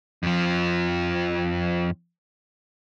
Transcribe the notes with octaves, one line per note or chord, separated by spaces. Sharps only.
F2 F3